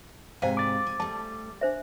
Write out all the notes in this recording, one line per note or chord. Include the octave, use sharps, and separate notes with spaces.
G#2 C3 C5 F5 G5 G#5
D6 A6
G#5
G3 A3 A5
D4 C5 E5